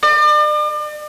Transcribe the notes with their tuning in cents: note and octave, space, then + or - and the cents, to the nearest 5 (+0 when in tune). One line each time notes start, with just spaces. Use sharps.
D5 +40